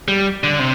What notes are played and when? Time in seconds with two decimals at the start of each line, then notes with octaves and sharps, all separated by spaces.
0.08 G3
0.43 D3
0.59 C3